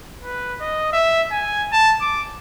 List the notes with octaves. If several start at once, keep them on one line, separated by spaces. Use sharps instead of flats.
B4
D#5
E5
G#5
A5
D6